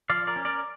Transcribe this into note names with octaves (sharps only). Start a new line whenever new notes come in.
F3 D5 F5
A#4 D5
C#4
A#4 D5